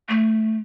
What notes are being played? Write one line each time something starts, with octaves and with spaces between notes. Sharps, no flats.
A3